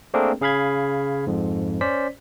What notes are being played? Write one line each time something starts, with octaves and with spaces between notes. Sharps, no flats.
A3 A#3 C4 D4 G#4 A#4
C#3 G#4 F5 B5 G#6
F2 G#2
C#4 C5 D5 B6